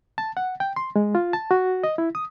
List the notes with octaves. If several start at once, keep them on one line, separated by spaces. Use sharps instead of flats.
A5
F#5
G5
C6
G#3
F4
A5
F#4
D#5
E4
D#6